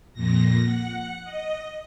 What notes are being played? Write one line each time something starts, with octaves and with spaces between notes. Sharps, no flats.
F2 A#2 A#6
F#5
D#5